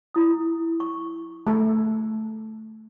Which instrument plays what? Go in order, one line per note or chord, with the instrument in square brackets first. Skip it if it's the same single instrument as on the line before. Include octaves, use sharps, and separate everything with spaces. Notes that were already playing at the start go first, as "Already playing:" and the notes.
[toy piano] E4 D#6
C#6
[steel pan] A3 A4